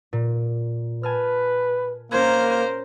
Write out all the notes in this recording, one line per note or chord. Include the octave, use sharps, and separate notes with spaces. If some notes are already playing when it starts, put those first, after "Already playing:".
A#2
B4 G#5 A5 F6
A#3 C#4 A#4 C5 C#6 G#6